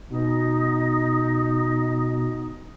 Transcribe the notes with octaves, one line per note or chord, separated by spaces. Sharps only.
B2 D#4